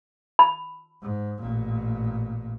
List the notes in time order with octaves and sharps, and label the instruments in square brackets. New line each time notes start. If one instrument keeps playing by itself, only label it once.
[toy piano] B5
[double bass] G#2
A1 A#2